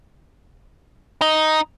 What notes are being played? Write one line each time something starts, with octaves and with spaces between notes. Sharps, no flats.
D#4